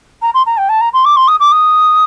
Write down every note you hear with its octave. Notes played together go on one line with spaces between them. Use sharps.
A#5
C6
A#5
G5
A5
A#5
C6
D6
C6
D#6
D6
D#6